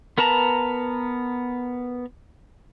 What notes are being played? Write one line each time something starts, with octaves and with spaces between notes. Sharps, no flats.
B3 A#4 B4 A5 A#5